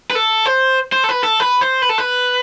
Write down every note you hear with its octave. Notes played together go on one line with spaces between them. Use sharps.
B4
A4
C5
C5
A4
B4
A4
B4
C5
B4
A4
B4